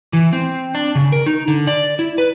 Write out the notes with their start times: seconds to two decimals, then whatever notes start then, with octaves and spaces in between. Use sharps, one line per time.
0.13 E3
0.33 C4
0.75 D4
0.95 C#3
1.12 A#4
1.26 D#4
1.48 D3
1.67 D5
1.99 E4
2.18 B4